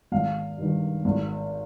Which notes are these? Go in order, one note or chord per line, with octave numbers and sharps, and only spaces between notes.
G#1 F5
G2 D#3
G#1